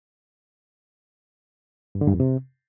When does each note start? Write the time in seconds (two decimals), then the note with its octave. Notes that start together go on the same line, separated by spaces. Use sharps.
1.95 G2
2.01 D3
2.07 G2
2.14 F2
2.20 C3